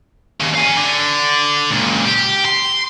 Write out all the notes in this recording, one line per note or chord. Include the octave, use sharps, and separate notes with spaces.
D#2 C#3
F5 G#5
D3
C#2 A#2
G4
C6